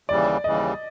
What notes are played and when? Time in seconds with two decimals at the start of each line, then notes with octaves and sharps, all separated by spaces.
0.09 D#2 C#3 E3 G3 D5
0.44 D#2 C#3 E3 G3 D#5